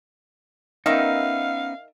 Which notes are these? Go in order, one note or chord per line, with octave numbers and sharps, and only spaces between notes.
D#3 B3 C#4 D#4 A#4 E5 F5